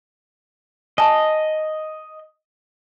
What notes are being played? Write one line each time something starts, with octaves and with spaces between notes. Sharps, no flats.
D#5 G#5 A5